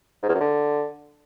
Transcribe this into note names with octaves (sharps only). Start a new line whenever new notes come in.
G#2
E2
F#2
D3